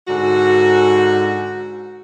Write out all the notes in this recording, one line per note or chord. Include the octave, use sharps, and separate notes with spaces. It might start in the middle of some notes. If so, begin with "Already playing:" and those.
G#2 D3 F#4